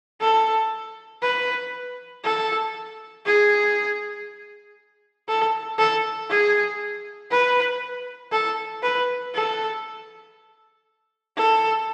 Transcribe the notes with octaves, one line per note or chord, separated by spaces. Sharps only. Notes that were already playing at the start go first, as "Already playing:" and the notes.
A4
B4
A4
G#4
A4
A4
G#4
B4
A4
B4
A4
A4